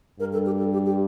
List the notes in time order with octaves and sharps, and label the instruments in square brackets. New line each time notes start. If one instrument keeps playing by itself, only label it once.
[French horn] G2 [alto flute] A#4
[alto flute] A4
G4
A4
G4
G4